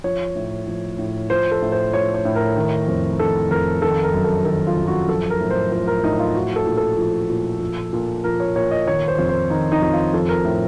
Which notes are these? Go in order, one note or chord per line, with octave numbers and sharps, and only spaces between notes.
F3 C#5
A2
F3
A2
F3 C5
A4
A2
C5
F3 C#5
C#5
A2
A#4
D#3
F2
D#3 A4
F2 A#4
D#3 A4
A#4
F#2
A4
D#3 A4
F4
F#2
F#4
F3 A4
A#4
A2
C5
F3 C5
A#4
A2 D#4
F4
F3 F#4
A4
A#2
A4
F3
A#2
F3
A#2
F3 A#4
C#5
A#2 C#5
D#5
D#3 C#5
C5
F2
C5
D#3 D#4
D#4
F2
F4
F3 A4
A#4
A2